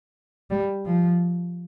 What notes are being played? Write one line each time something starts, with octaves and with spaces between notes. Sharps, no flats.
G3
F3